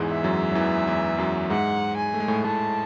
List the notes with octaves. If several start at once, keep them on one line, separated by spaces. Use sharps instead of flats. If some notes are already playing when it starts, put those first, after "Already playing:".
Already playing: E2 G#2 E3 G#3
E5
F#2 F#3
F#3
E2 E3
E2 E3
F#2 F#3
G#2 G#3 F#5
G#5
A3
G#3
A2 A3
A2 A3 A5